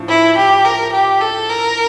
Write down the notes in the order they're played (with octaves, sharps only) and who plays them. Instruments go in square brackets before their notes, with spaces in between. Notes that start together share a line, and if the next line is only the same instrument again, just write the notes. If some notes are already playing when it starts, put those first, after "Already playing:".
Already playing: [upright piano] A2 F3 D4
[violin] E4
G4
A#4
G4
A4
A#4